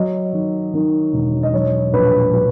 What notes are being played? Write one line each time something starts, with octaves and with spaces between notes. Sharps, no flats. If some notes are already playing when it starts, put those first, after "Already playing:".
Already playing: F#3 D#5
D#3
D#3
E1
D#5
F#3 C#5
A#1 B4
F#3 B4